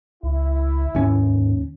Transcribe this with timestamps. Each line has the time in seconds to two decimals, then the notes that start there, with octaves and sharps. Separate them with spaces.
0.23 C#2 E4
0.95 D#2 G#2 C#4